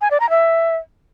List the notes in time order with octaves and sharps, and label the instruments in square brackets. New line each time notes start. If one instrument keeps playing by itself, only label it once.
[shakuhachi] G#5
D5
A#5
E5